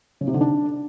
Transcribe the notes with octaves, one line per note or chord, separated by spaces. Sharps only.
C#3
C3
D3
D4